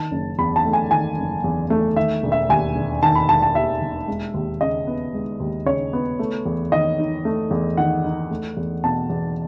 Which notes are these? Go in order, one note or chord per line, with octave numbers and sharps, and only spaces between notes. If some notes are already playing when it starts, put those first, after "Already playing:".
Already playing: D#3 A5
F#1
E2 B5
A5
A3
G#5
D#3 G#5
F#1
E2
A3
D#3 E5
E1
E5
D#2 G#5
E1
D#3 A5
B5
E1 A5
A5
D#2 E5
E1
G#3
D#2
C#3 D#5
B3
G#3
D#2
C#3 C#5
B3
A3
E2
D#3 D#5
D#4
A3
E2
D#3 F#5
D#4
A3
E2
B2 A5
E2